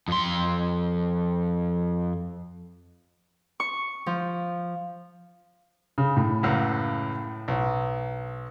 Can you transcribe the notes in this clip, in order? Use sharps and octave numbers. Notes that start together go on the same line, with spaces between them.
F2 C6
C#6
F3
C#3
A2
C#2 F#2 C#3
B1